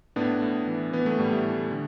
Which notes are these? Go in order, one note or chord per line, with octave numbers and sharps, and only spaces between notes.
A2 B3 D4
A2
E3
E3 B3
A3
A2 G3
A3
E3
D3